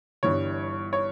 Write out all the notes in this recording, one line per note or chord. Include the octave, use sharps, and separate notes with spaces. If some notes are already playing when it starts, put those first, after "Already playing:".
G1 G2 E3 G3 C#5
C#5